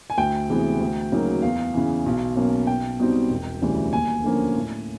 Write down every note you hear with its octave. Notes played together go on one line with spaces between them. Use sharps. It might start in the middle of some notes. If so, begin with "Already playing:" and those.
G#5
D2 G5
C3 E3 G#3 B3
D2
C#3 F#3 A#3 D#4
E2 F5
C#3 E3
B1
B2 F#3 A#3 C#4
B1 G5
B2 G3 C4 D#4
E1
D2 C#3 E3 G3
D#2 G#5
D3 F3 A#3 C#4
A2